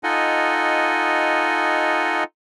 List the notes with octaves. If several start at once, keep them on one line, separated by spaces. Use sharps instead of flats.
D#4 F4 A4 D#5 F#5 G#5